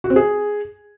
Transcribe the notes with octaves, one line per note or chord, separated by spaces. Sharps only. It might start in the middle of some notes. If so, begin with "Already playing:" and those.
F#4
C4
G#4